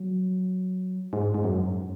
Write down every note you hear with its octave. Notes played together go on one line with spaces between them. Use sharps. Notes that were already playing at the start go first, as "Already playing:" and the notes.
Already playing: F#3
G#2
G#2
F#2